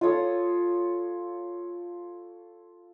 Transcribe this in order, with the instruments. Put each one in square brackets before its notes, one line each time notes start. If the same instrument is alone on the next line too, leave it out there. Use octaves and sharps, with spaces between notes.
[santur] F4 A4 C#5 D#6